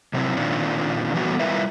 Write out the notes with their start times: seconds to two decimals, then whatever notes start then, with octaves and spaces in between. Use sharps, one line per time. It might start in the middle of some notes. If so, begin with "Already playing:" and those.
0.13 C3 F#3 C4 E4
0.37 A#2 D#3 C4 D4 F4
1.14 E3 F#3 G3 A3 B3 F#4
1.40 G3 E4 F4 A#4 B4 E5